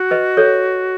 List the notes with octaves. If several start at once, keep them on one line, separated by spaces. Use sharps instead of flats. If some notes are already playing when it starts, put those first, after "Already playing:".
Already playing: F#4
B4 D#5
A4 C#5